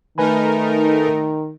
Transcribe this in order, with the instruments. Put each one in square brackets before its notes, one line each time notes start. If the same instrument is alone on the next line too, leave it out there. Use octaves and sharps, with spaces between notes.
[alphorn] D#3 [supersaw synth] A3 D#4 A#4 [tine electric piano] B4 G#5 B5